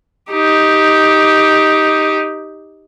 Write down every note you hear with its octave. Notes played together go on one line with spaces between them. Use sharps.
D#4 G4